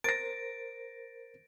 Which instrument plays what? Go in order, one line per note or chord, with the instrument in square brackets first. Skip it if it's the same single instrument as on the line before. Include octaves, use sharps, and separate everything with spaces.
[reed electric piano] A#4 C5 [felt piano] A6 A#6 [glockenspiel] D7